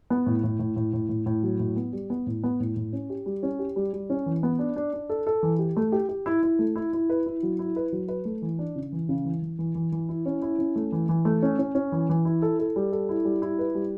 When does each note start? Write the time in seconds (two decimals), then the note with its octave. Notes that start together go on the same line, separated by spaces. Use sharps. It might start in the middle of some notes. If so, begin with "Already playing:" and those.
0.10 B3
0.26 A2
0.44 A2
0.59 A2
0.76 A2
0.93 A2
1.09 A2
1.26 A2
1.43 F#3
1.60 A2
1.76 B3
1.93 G3
2.10 B3
2.26 A2
2.44 B3
2.60 A2
2.76 A2
2.93 C#4
3.10 G4
3.26 G3
3.43 C#4
3.59 G4
3.76 G3
3.93 G3
4.10 C#4
4.26 E3
4.43 B3
4.59 D4
4.76 D4
4.93 D4
5.09 A4
5.27 A4
5.43 E3
5.59 G4
5.77 A3
5.92 G4
6.09 G4
6.26 E4
6.43 E4
6.59 A3
6.76 E4
6.93 E4
7.10 B4
7.26 E4
7.43 F#3
7.59 E4
7.76 B4
7.92 F#3
8.08 B4
8.25 A3
8.42 E3
8.59 D4
8.76 C#3
8.92 E3
9.09 C#3
9.25 E3
9.42 E3
9.59 E3
9.75 E3
9.92 E3
10.09 E4
10.26 C#4
10.42 E4
10.59 C#4
10.76 A3
10.92 E3
11.09 E3
11.25 A3
11.42 C#4
11.59 C#4
11.75 C#4
11.92 E3
12.09 E3
12.25 E4
12.42 A4
12.59 A4
12.76 G3
12.92 A4
13.09 E4
13.25 G3
13.42 E4
13.59 B4
13.75 G3